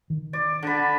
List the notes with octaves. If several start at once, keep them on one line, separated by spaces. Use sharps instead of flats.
D#3
D5
D3 B5